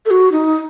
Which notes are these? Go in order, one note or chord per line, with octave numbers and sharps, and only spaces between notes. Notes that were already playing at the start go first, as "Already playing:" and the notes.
A4
F#4
D#4